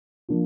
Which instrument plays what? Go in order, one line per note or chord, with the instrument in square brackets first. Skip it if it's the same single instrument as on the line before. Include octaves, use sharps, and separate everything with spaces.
[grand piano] F3 A#3 D4 F4